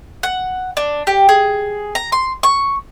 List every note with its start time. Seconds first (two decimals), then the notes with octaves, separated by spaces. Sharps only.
0.23 F#5
0.77 D4
1.07 G4
1.29 G#4
1.95 A#5
2.12 C6
2.43 C#6